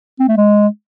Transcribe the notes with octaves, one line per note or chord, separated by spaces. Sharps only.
C4
A3
G#3